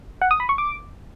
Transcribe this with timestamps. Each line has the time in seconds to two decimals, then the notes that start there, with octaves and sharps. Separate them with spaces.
0.22 F#5
0.31 D#6
0.40 B5
0.49 C#6
0.58 D6